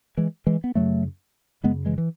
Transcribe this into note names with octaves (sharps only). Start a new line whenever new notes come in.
E3 G#3
E3 G#3
B3
F#2 C#3 F#3 A3
F#2 C#3 G#3 B3
E3 G#3
E3